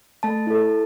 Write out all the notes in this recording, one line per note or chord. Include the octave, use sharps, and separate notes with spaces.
A3 A5
E4 A4